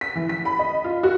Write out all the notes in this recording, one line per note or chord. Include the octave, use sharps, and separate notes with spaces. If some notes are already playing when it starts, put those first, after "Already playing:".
B6
E3
B6
B5
D#5
F4
F#4